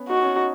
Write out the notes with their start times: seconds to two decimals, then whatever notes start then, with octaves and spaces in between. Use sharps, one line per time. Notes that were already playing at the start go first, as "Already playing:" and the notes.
Already playing: B3 C#4
0.09 D#4 F#4
0.23 C#4
0.35 D#4